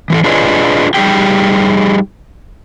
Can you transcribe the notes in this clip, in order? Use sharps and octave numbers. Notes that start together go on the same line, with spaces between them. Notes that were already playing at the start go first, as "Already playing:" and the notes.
E3 E4 A4
D4 F4 G#4 B4 C#5 D#5
G3 D#4 F4 G4 G#4 G5